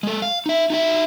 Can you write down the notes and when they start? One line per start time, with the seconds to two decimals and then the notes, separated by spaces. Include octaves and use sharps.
0.03 G#3 A4
0.22 F5
0.46 D#4 E5
0.70 D#4 F#4 E5